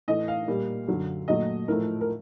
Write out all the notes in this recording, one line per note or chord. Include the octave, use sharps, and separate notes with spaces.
A2 E3 A3 D#5
F5
A#2 G3 A#3
F#2 D3 F#3
A#2 F#3 A3 D#5
A2 F3 A3 A#4
A#4